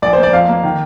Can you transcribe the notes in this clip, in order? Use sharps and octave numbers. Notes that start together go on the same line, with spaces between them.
A#1 D5
C5
A#3
D5
F2 F5
A#3
D#3